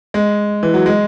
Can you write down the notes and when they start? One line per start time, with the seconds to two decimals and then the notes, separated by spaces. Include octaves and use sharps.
0.14 G#3
0.63 E3
0.74 F#3
0.86 G#3